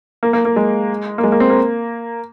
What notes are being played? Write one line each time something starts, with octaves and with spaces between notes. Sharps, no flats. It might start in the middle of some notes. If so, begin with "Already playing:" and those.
A#3
A#3
A#3
G#3
A#3
G#3
A#3
C4
A#3